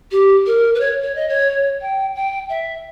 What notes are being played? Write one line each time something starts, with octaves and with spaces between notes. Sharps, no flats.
G4
A#4
B4
C#5
C#5
D#5
C#5
G5
G5
E5